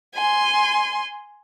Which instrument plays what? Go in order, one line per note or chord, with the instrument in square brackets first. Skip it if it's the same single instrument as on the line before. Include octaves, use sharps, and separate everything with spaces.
[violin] G#5 C6